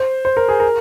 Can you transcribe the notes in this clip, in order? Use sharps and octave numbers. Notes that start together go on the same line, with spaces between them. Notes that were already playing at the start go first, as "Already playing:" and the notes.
Already playing: C5
C5
A#4
G#4
A#4